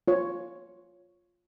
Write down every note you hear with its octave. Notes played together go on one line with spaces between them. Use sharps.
F4 C#5